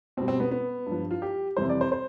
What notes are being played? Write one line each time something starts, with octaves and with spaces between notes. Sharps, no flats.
B2 G3 C4
C4
B3
B3
G2 F3
F4
G4
F2 C3 E3 G3 C5
D5
C5
C5